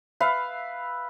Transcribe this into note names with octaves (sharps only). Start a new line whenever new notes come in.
B4 E5 F5